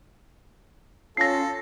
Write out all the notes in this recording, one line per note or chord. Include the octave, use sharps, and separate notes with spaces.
C#4 F4 A4 A#6 C7